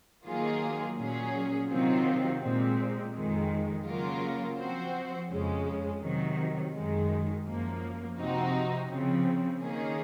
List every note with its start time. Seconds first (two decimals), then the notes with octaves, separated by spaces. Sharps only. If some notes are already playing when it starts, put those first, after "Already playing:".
0.25 D#3 F#3 A#3 F4 G#4
0.98 A#2 F#3 C#4 G#4
1.69 C3 D#3 F#3 C4 F4
2.41 A#2 G#3 C4
3.14 F2 D#3 G#3
3.86 C#3 F#3 A#3 F4 A#4
4.58 F3 C4 F#4 C5
5.30 F2 C#3 G#3 C#4
6.02 C3 D#3 F#3
6.74 F#2 D#3 G#3
7.46 F#2 F3 A#3
8.18 C3 F3 C4 D#4 F#4
8.90 C#3 F3 C4
9.62 D#3 A#3 C#4 G#4